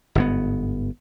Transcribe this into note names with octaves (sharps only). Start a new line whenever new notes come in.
G1 G#2 B3